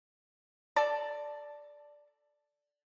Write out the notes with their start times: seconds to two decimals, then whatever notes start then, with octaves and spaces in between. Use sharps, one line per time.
0.76 A4 D5 A5